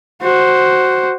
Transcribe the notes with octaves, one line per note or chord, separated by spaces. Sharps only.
F#4 C5